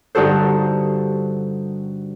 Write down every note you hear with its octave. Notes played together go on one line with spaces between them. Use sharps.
G2 D3 D#4 F#4 A4 C5